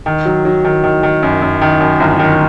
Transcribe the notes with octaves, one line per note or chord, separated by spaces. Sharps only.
D#3
F#3
F#3
D#3
D#3
D#3
F#2
F#2
D#3
F#2
G1
D#3